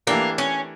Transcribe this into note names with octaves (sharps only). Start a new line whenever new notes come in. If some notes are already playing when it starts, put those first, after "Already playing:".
E3 A3 A#3 D4 G4 A#4
C#4